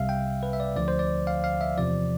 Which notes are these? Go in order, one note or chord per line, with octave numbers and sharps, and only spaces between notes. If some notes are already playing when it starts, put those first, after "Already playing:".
Already playing: C2 C3 G3 E5 F5
G5
B4
E5
D5
D2 D3 F3 D5
C5
D5
F5
F5
E5
E2 C3 F3 D5